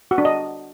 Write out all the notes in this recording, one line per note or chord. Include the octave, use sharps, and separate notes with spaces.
F#4
D4
D#5